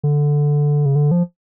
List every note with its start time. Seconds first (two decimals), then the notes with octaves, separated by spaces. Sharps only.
0.03 D3
0.86 C#3
0.96 D3
1.11 F3